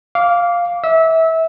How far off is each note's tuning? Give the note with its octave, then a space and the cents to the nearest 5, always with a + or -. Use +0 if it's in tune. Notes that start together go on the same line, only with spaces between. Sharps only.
F5 +0 D6 -20
E5 -25 E6 -20